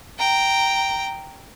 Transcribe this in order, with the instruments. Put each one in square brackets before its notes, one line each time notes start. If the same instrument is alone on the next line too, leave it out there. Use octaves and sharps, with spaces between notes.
[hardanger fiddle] G5 A#5